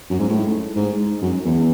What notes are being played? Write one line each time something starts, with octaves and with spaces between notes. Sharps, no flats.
F#2
G#2
A2
G#2
F#2
E2